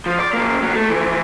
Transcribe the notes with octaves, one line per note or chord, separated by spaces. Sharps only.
F3
D5
F#2 A#3
D#2 F#3
A3
E3 F3